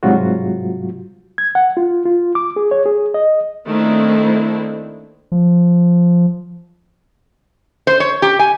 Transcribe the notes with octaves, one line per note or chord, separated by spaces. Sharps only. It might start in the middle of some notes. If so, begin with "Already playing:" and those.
G#2 C3 F#3 G3 F4 F#4
G#6
F#5
F4
F4
D6
G#4
C#5
G#4
D#5
D#3 A3 A#3 C4 D4 E4
F3
C5
C#5
G4
G#5